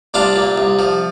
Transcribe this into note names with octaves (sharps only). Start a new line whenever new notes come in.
C2 D4 F4
A#2
C2
F3